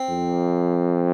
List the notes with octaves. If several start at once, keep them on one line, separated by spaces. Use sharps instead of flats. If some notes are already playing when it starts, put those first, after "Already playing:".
Already playing: C4
F2